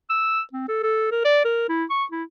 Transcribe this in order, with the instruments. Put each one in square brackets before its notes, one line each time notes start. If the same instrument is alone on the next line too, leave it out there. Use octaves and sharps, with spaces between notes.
[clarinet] E6
C4
A4
A4
A#4
D5
A#4
E4
C#6
E4